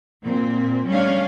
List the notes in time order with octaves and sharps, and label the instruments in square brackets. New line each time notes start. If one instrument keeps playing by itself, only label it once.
[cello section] A#2 C4
G3 A3 C#4 D4 F5